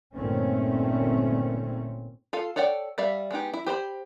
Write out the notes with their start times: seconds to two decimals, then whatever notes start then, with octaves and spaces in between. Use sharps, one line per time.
0.14 G1 A#2 D#3 A3 C4 C#4
2.33 F4 A4 F5
2.56 A4 C#5 D5 F#5 G5
2.98 G3 D5 E5 F5
3.31 G#3 B3 D#4 G4
3.54 E4
3.66 G4 C5 C#5 B5